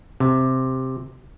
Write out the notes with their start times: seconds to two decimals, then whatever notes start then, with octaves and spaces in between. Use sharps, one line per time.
0.20 C3